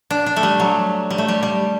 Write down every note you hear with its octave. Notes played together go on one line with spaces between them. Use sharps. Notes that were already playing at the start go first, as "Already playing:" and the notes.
D4
D4
A3
G3
F#3
G3
A3
G3
G3